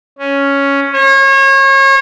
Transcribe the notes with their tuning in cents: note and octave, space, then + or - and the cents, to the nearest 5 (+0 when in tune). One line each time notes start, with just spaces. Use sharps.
C#4 +5
C#5 -35